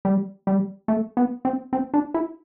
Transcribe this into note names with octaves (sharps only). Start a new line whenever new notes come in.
G3
G3
A3
B3
C4
C4
D4
E4